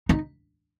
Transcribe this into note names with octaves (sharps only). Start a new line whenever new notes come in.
D#4